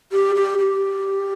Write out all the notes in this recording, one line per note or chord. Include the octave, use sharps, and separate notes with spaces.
G4
G4
G4